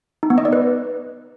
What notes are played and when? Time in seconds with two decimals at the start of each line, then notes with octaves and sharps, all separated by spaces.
0.23 D#4
0.30 B3
0.38 D#5
0.45 D5
0.53 B4